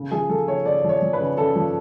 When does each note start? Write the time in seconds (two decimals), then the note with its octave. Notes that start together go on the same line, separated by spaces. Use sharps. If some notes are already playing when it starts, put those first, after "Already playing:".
Already playing: C#3
0.11 F3 G#4
0.29 F3 A4
0.47 C#3 C#5
0.65 C#3 D5
0.84 F3
0.89 C#5
1.02 F3
1.13 B4
1.19 C#3
1.37 C#3 A4
1.56 F3